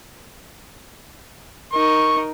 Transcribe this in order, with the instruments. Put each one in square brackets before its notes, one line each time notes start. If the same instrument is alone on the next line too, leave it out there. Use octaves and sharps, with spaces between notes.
[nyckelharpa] D#4 A#4 [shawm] C#6